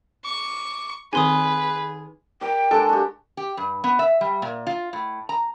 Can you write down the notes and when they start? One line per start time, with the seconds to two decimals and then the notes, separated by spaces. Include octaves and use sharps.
0.25 C#6 D6
1.13 D#3 C4 D#4 G#4 B4 G#5 C6 D#6
2.41 A#4 D5 G5
2.71 G#3 D4 A4
2.89 F#4 G4
3.37 G4
3.57 G2
3.84 B3
3.99 E5
4.21 G3
4.42 A#2
4.67 F4
4.93 A2
5.29 A#5